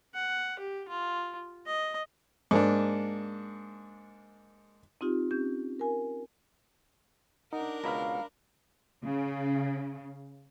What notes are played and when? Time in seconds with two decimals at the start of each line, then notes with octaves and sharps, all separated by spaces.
0.14 F#5
0.59 G4
0.89 F4
1.66 D#5
2.51 G#2 A#3 D4
5.01 C4 D#4 F4 G4
5.31 C4 C#4 G4 G6
5.79 A#4 G#5
7.53 D4 D#4 A#4 F#5
7.84 C#2 B2 F5 A#5 B5 F6
9.03 C#3